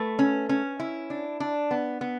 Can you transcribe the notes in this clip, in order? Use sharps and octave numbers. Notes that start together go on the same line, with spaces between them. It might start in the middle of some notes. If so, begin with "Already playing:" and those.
Already playing: A3 B4
C#4
C#4
E4
D4
D4
B3
B3